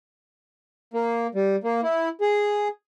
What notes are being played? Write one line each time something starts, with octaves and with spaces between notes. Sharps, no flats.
A#3
G3
A#3
E4
G#4